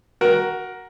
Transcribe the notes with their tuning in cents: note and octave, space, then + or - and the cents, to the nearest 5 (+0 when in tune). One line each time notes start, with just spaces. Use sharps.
F#4 +0 A#4 +5